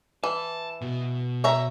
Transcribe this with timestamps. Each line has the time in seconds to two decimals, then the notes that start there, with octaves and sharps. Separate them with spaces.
0.24 E3 A5
0.82 B2
1.44 C#5 E5 A#5